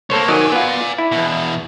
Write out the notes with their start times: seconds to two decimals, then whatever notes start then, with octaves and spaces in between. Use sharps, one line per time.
0.10 C2 A#3 A4 C5 C#5
0.28 D#3 F#3 D5 G#5
0.52 B3 F4
0.98 E4
1.12 E2 B2